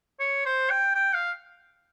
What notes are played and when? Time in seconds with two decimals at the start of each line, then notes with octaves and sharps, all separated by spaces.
0.19 C#5
0.45 C5
0.70 G5
0.95 G5
1.14 F5